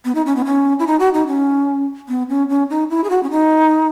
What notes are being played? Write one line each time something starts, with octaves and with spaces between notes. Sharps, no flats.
B3
D#4
C#4
B3
C#4
E4
D#4
F#4
D#4
C#4
B3
C#4
C#4
D#4
E4
G#4
F#4
C#4
D#4